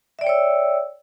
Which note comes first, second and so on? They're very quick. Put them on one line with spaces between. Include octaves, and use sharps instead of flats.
E5 D5 G5 C#5 E6